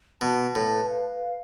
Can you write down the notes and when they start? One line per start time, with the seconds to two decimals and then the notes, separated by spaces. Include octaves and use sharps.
0.21 B2 A5
0.55 A2 B4
0.88 F5